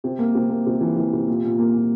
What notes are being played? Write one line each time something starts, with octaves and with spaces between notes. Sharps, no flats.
C3
A#3
C3
A#3
C3
E3
E3
C3
A#2
A#2
A#3
A#2